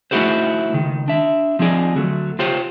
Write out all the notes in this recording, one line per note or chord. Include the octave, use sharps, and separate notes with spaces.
A3 D#4 E4 F#4 G#4 C5
C#2 D#3
D4 E5
F3 C4 D#4 G#4 D5
D2 F#3 A3
F4 G4 C5 C#5